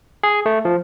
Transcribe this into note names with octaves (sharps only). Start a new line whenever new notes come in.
G#4
A3
F3